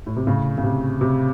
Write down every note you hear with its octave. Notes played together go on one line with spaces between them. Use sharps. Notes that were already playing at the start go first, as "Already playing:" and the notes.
A2
C3
A2 C#3
C#3
C3
C3